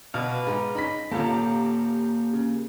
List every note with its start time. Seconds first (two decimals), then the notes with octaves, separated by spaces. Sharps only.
0.14 B2 B4 D5 F5
0.47 G#2
0.75 D#4 B5 B6
1.12 D#1 A#3 F4 G4 A4 A#5
2.33 C#3